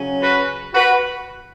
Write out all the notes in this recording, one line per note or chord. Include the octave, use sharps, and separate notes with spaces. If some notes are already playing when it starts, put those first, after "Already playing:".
Already playing: C#3 F#3 C#4
F#4 B4
F#4 B4